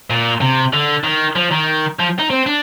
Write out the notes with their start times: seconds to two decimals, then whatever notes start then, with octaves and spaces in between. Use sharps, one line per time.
0.10 A#2
0.41 C3
0.73 D3
1.04 D#3
1.36 F3
1.51 D#3
1.99 F3
2.19 D#4
2.30 C4
2.46 D4